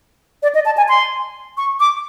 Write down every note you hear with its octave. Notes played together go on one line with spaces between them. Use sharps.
D5
D#5
A5
G#5
C6
C#6
D6